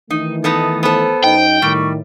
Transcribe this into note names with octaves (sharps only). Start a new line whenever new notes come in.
D#3 E3 A3 D#4
B3 D#4 A4 D#6
B3 A4 C5
F#2 D#4 D#5 G5
A2 D#3 G3 C#6